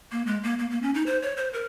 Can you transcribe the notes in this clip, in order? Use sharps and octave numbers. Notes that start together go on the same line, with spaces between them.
A#3
G#3
A#3
A#3
A#3
C#4
D#4
C5
C#5
C5
A#4